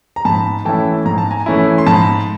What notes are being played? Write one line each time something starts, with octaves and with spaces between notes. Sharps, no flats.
A#5
G#2 A5 B5
E3 A3 C#4 E4 G5 A5
G#2 A#5
A5
G#5 A#5
E3 A3 C#4 E4
C6
G#2 A5 B5